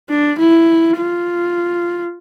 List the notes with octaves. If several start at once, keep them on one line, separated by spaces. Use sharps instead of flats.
D4
E4
F4